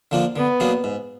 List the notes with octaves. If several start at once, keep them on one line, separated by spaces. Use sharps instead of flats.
D3 F3 A#3 D4
D3 B3
F#3 A#3 D4 G#4
G#2